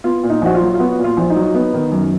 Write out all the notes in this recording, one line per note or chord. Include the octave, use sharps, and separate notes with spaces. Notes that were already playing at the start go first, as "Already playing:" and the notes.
B3 F4
A#2
D#4
A#1 F#4
F4
F#3
F4
B3 F#4
A#2
F4
A#1
D#4
F#3
B3
D#3
F#2